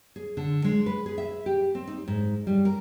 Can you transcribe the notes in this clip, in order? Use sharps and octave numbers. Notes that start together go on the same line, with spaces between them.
G#4
D3
G#3
B4
G#4
E5
G4
C4
D#4
G#2
G3
A#4